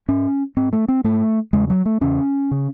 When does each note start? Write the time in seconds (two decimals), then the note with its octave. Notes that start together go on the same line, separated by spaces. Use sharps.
0.08 G#2 C#4
0.57 G#2 C4
0.73 A3
0.88 C4
1.04 G#2 A3
1.53 E2 C#3 G#3
1.70 F#3
1.85 A3
2.01 E2 C#3 C#4
2.51 C#3